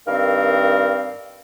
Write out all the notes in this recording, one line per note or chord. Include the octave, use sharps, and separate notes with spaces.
G2 D#3 C4 A#4 F5